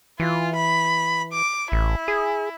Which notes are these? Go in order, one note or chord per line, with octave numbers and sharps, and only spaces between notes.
E3 F4
B5
D6
A1 E4
G#4